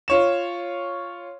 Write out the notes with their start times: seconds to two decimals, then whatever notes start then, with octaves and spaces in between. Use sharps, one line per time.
0.08 F4 C#5 E7